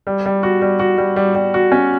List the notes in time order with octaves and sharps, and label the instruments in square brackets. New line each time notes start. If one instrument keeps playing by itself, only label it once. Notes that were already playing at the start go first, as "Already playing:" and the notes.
[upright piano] G3
G3
F#4
G3
F#4
G3
G3
G3
F#4
C#4